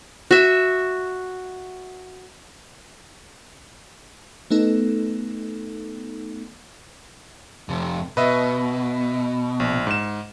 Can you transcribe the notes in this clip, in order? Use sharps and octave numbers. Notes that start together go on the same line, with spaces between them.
F#4 E5
A3 B3 D#4 A4
F2 C3
B2 B4 D#5 E5
A#1
G#2 E7